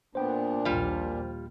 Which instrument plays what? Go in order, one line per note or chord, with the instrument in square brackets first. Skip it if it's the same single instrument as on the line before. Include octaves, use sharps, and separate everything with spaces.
[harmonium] A#2 D4 [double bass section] B3 [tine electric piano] C5 G5
[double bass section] A#1 D#2 [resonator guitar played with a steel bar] G3 F4